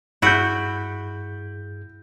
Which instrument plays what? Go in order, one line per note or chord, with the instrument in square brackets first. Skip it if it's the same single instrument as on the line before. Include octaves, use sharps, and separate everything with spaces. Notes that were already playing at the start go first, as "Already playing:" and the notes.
[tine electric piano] G2 G#4 B6 [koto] E4 F#4 [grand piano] G6 D7